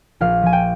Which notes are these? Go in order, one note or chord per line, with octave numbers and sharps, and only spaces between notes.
A#1 F5
F3 G#5
G5